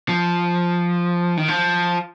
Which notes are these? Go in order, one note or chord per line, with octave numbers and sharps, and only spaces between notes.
F3
D#3
F3